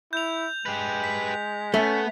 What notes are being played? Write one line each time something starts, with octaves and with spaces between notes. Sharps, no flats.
E4 G6 F7
G#3 G4 B4
B6
A3 B3 C#4